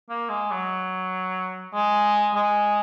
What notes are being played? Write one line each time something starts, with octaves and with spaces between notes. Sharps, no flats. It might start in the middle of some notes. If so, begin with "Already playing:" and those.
A#3
G#3
F#3
G#3
G#3